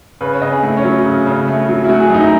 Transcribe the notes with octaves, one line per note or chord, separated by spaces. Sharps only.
C#3 B4
C#5
C#3 D#5
G#4
A3 E4
C#4
F#3
C#3
C#3
A3
F#3
E4
A3 F#4
G#4
F#2 D#4
E4